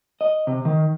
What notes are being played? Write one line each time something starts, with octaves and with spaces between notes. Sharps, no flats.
D#5
C3
D#3